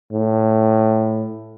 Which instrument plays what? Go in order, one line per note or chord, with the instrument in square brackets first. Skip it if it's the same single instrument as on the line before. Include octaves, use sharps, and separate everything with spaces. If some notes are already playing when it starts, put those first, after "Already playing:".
[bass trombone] A2